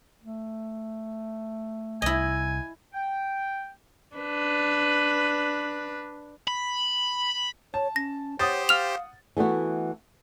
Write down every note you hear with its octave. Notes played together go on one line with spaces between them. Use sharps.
A3
C2 C3 E4 D#5 G#5
G5
D4 B4
B5
C#5 A5
C#4 A#6
G4 C5 C#5 F#5 D#6 A6
F5 F6 F7
E3 A3 B3 F#4